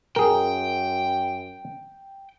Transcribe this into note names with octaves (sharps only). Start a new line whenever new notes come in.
F#2 G#4 A#4 G5